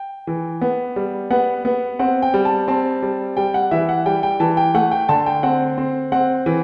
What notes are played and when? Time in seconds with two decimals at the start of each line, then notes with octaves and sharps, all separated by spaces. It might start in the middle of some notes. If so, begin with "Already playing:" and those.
Already playing: G5
0.27 E3
0.61 B3
0.96 G3
1.30 B3 F#5
1.65 B3
1.99 C4 F#5
2.22 G5
2.34 G3
2.45 A5
2.68 C4 A5
3.02 G3
3.37 G3 G5
3.54 F#5
3.71 E3 E5
3.89 F#5
4.06 G3 G5
4.23 G5
4.40 E3 A5
4.57 G5
4.74 A3 F#5
4.92 G5
5.09 D3 A5
5.26 G5
5.43 C4 F#5
5.78 C4
6.12 C4 F#5
6.46 E3